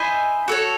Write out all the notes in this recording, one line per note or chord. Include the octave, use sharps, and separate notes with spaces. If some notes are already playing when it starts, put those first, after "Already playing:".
Already playing: E4 C5 D#5 G#5
F#4 A4 C#5